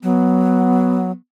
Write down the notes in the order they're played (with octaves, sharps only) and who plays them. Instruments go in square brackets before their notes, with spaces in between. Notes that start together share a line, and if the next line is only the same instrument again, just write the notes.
[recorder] F#3 [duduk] B3